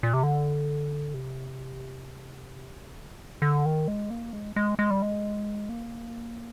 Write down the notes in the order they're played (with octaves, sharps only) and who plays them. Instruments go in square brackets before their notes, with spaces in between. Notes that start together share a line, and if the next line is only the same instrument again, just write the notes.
[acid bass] A#2
C3
D3
C3
D3
A#2
C3
D3
D#3
G#3
A#3
G#3
G#3
G#3
G3
G#3
A#3